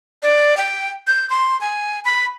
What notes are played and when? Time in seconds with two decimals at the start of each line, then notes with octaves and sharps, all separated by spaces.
0.23 D5
0.57 G5
1.07 G6
1.30 C6
1.61 G#5
2.05 B5